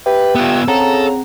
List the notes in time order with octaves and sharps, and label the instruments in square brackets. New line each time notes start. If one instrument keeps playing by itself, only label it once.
[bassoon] G4 [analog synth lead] B4 [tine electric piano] E5
[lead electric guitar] B3 F4 [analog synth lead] E6
[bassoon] C#3 [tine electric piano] C4 G#4 F#5 [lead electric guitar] A4 [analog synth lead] A#5